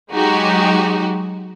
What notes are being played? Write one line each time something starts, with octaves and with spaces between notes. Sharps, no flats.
F#3 G#3 D#4 F#4 G4